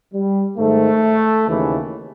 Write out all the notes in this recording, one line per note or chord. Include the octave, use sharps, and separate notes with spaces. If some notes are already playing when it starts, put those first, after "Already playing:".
G3
G#2 D#3 A3
D#2 C#3 E3